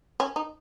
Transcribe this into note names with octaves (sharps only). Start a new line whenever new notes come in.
C#4
D#4